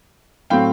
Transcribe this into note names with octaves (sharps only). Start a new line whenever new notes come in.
A2 F#3 A3 C4 F5 G5